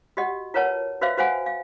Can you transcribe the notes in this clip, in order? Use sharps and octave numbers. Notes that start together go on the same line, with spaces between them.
F#4 G4 D#5 F#5
F4 A#4 B4 C#5 F#5 A5
F#4 B4 C5 E5 F5
F#4 B4 C5 F5 F#5 G#5
F5